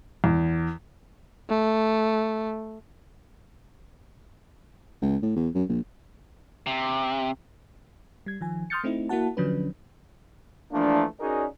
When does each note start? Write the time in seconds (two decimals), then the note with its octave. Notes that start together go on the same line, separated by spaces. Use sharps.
0.24 E2
1.49 A3
5.02 C#2
5.22 A2
5.36 E2
5.54 F#2
5.69 A#1
6.67 C3
8.26 G3 G#6
8.41 D#3 F3 G#5
8.70 C6 D#6 F6 G6 A6 C#7
8.84 A3 C4 D#4 E4
9.09 A#3 E4 F#4 F#5 A5
9.37 D3 F3 F#3 C#4 D4 B4
10.72 E3 F3 A3 A#3 D4
11.20 C#4 D#4 F#4 G#4 A#4 D5